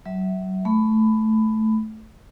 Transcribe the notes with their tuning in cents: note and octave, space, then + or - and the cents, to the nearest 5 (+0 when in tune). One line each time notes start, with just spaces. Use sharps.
F#3 +30 E5 -10
A3 -10 B5 +15